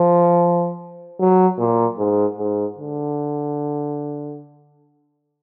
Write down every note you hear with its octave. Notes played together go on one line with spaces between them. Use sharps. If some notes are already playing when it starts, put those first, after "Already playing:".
Already playing: F3
F#3
A#2
G#2
G#2
D3